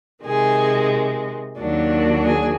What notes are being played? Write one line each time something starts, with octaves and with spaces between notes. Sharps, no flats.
C3 D#3 G#3 G#4
D#2 D#3 F#3 A#3 D4
G#4